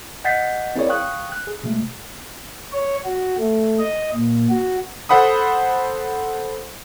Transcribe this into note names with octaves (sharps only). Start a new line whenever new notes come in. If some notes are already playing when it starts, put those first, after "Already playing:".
D#5 F#5 G6 A6 B6 C7
C4 E4 G#4 A#4 C#5 D5
F5 G5 C#6 D#6 F#6
F#6
G#4
B2 G#3 A3
C#5
F#4
A3
D#5
A#2
F#4
A4 C5 F#5 B5 D#6